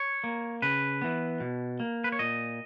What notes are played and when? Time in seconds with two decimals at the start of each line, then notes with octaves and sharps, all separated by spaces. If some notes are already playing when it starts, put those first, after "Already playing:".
Already playing: C#5
0.24 A#3
0.62 C#3 B4
1.02 E3 B3
1.40 B2
1.80 A#3
2.04 B4
2.12 C#5
2.19 A#2 D#5